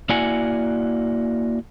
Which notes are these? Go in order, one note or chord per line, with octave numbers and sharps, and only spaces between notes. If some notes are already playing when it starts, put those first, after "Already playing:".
A#3 E4 F#4 D5 F#5 G#5